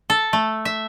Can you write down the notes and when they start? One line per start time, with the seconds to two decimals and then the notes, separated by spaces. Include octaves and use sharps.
0.10 A4
0.33 A3
0.65 E5